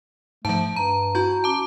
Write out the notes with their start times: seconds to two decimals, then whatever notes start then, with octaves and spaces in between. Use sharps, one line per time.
0.45 G#2 F3 A3 A5
0.76 G2 A#5
1.15 E4 F#4 G6
1.44 C#4 A5 D6